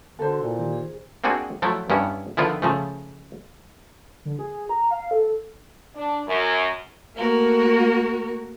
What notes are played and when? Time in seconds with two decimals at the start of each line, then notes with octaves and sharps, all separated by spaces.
0.19 D3 F#4 A4 C5 C6
0.42 A#2 E4
0.59 D#3 G4
0.73 G#4 C5
1.24 A#3 C4 D4 F#4 G#4
1.62 F3 F#3 A3 E4
1.90 G2 B3 C#4 E4
2.37 D3 D#3 F3 B3 E4 F4
2.62 C#3 F3 A3
4.25 D3
4.39 G#4
4.69 A#5
4.91 F5
5.11 A4
5.94 D4
6.27 F#2
7.16 A3 A#3 F#4 A#4